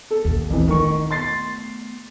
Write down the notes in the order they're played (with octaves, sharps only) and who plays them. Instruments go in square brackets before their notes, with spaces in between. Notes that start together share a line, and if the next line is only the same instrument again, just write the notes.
[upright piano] A4
[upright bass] A#1 D#2
[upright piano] F2 E3
[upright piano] D#3 C#6 [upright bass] A3 B3
[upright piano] C6 A6 C7